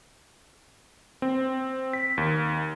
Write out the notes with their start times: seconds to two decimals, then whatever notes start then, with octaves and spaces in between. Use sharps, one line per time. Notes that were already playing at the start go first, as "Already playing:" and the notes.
1.22 C4
1.93 B6
2.17 D#2